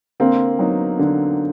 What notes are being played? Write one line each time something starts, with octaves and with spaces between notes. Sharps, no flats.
D3 A#3 C4
F#3 B3 D#4
D3